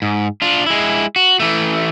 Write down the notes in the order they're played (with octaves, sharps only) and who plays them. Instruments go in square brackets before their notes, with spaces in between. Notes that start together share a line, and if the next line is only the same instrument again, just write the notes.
[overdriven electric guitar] G#2
D4 F4
G#3 E4
F#4
E3 A3